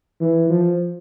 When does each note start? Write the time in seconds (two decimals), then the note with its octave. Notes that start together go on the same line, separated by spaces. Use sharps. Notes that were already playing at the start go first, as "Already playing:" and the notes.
0.20 E3
0.49 F3